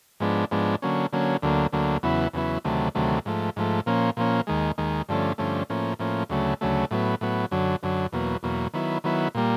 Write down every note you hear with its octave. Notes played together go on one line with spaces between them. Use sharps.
G#2 F3 G#3 B3 D4
G#2 F3 G#3 B3 D4
D3 F#3 A#3 C#4
D3 F#3 A#3 C#4
D2 D3 F#3 A#3
D2 D3 F#3 A#3
E2 C#3 F#3 B3 E4
E2 C#3 F#3 B3 E4
D2 C3 D#3 F#3 A3
D2 C3 D#3 F#3 A3
G#2 F3 A3
G#2 F3 A3
A#2 F3 A#3 C#4
A#2 F3 A#3 C#4
D#2 D#3 G#3
D#2 D#3 G#3
G2 D3 F3 A3 C#4
G2 D3 F3 A3 C#4
A2 F3 A#3 C#4
A2 F3 A#3 C#4
D2 C#3 F#3 A3
D2 C#3 F#3 A3
A2 F#3 B3
A2 F#3 B3
F#2 D3 F#3
F#2 D3 F#3
E2 B2 F#3 A#3
E2 B2 F#3 A#3
D#3 F#3 B3 E4
D#3 F#3 B3 E4
A#2 G3 A#3